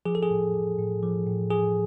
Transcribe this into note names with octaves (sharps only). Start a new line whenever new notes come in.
F3 G#4
A4
G#4
A2
F3
A2
F3
A2
F3 G#4